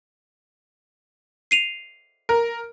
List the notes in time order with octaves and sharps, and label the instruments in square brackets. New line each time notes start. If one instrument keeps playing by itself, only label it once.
[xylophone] C7 D#7 F7
[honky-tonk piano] A#4